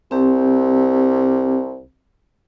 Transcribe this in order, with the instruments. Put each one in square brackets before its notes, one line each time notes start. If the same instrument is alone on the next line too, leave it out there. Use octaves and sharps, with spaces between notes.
[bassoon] C2 [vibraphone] C4 G4